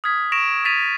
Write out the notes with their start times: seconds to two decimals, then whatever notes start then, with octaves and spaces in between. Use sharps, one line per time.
0.04 D#6 F6 G#6 B6
0.32 C#6 A#6 D7 E7 F7
0.65 D#6 A6 B6 D7 D#7 F7